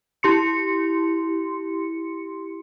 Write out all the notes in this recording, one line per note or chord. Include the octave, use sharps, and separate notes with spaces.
E4 G4 C6 C#7